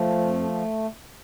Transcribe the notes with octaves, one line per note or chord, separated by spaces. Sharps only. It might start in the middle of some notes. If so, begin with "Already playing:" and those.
Already playing: F3 A3
F2